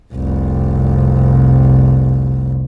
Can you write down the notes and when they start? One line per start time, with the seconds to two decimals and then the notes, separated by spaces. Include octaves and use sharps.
0.13 F1 C2